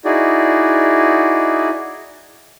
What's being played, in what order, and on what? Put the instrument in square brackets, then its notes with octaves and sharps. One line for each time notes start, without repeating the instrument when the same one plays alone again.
[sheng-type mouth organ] D#4 E4 F#4 G#4 D5